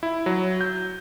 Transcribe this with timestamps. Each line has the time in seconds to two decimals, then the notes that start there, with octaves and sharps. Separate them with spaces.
0.03 E4
0.26 F#3
0.61 G6